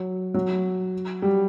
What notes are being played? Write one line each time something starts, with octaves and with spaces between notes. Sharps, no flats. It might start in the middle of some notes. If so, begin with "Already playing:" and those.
Already playing: F#3
F#3
G3